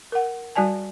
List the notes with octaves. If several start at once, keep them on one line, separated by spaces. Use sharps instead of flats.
A#4 F#5
G3 F#4 D5 G#5 A5